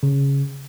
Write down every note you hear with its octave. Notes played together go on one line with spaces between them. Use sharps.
C#3